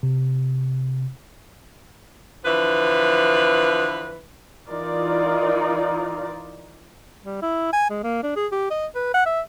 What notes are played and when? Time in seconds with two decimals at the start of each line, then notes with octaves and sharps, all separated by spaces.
0.03 C3
2.45 D3 E3 F3 B4
4.69 E3 D#4 F4 A#4 D5
7.23 G3
7.42 E4
7.73 G#5
7.90 G#3
8.03 A#3
8.23 D4
8.36 G#4
8.52 G4
8.70 D#5
8.95 B4
9.14 F#5
9.26 E5